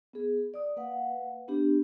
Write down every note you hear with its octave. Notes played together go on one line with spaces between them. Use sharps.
B3 G#4
D5 D#6
A#3 B4 F5 F#5
B3 D4 G4